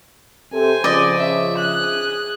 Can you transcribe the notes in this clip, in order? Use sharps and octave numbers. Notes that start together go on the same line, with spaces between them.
C3 A4 C5 G#5
C#3 F3 D5 D#5
E5
G#4 F#6